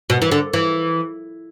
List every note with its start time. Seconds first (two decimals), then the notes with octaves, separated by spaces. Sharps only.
0.10 B2
0.22 E3
0.32 D3
0.54 E3